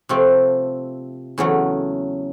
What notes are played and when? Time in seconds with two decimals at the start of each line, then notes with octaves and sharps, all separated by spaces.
0.09 C3 F3 A3 C4
1.38 E2 C#3 F#3 A3